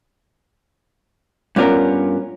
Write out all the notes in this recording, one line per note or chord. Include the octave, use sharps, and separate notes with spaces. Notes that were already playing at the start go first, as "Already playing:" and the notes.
G2 B3 C#4 F4 F#4 A#4